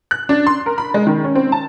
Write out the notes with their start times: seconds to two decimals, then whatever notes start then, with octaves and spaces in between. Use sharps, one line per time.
0.11 F#6
0.29 D4
0.47 C6
0.66 A#4
0.78 B5
0.94 G#3
1.07 D#3
1.24 C#4
1.35 C4
1.52 A5